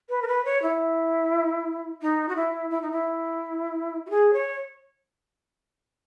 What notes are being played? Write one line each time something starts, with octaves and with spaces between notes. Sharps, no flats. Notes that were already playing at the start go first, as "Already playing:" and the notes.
B4
A#4
B4
C#5
E4
D#4
F#4
E4
E4
D#4
E4
F#4
G#4
C#5